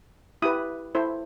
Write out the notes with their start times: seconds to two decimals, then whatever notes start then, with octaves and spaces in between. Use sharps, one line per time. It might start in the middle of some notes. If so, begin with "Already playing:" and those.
0.42 E4 G4 B4 D#6
0.95 E4 A4 C5